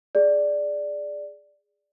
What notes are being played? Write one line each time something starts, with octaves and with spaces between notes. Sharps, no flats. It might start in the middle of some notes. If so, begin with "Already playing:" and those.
G#4 D5